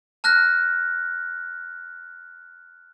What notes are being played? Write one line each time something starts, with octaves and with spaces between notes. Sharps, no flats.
A5 F6 F#6 A#6